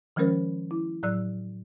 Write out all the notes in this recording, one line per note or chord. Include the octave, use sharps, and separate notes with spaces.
D#3 F3 G#3 C#4 A#4 C5
E4
A2 F#3 D5 E6 F#6